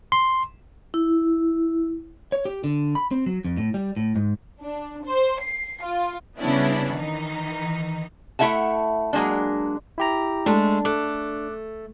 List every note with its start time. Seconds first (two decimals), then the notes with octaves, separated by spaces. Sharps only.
0.12 C6
0.94 E4
2.32 C#5
2.45 G4
2.64 D3
2.95 B5
3.11 C4
3.26 F#3
3.45 F2
3.57 A2
3.74 G3
3.97 A2
4.16 G#2
4.61 D4
5.05 C5
5.40 C7
5.83 F4
6.38 C#3 G3 B3 C#4 D4 E4
6.94 D#3 E3 D#4
8.39 A3 E4 E5 F#5 A5
9.13 F#3 G#3 A#3 D4
9.98 E4 G4 A#5
10.46 G#3 A3 D4
10.85 A3 D6 F#6